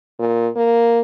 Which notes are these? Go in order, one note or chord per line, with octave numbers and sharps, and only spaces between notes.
A#2
A#3